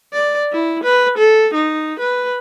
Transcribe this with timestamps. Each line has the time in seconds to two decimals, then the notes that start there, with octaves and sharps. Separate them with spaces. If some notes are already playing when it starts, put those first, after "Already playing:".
0.13 D5
0.52 E4
0.83 B4
1.18 A4
1.54 D#4
1.99 B4